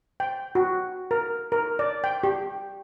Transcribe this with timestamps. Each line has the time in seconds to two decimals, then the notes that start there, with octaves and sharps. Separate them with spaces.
0.20 G5
0.55 F#4
1.11 A#4
1.52 A#4
1.79 D5
2.04 G5
2.23 G4